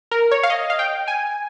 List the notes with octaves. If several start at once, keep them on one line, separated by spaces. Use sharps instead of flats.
A#4
C#5
F5
D#5
F5
G5
G#5